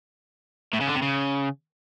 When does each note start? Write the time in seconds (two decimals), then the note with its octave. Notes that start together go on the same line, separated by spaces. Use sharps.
0.73 A2
0.80 C#3
0.88 D3
0.95 C3
1.02 C#3